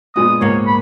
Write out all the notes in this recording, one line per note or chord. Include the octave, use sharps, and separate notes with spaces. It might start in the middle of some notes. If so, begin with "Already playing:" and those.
A#2 G#3 B3 D#6
C#2 G#2 A#3 C#5
B5